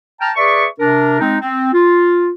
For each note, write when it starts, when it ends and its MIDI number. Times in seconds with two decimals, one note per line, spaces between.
0.21 0.30 79
0.21 0.30 81
0.21 0.30 82
0.21 0.30 89
0.36 0.65 68
0.36 0.65 71
0.36 0.65 74
0.36 0.65 76
0.36 0.65 85
0.79 1.17 48
0.79 1.17 62
0.79 1.17 70
1.20 1.36 56
1.20 1.36 60
1.20 1.36 63
1.42 1.72 60
1.73 2.30 65